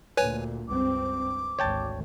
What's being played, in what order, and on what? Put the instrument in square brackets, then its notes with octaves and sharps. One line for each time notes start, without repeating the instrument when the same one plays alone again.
[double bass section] D2 A#2 [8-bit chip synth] B4 C#5 G#5
[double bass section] C#2 G2 C4 [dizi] D6
[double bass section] G#1 D2 [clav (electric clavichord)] C#5 G5 A5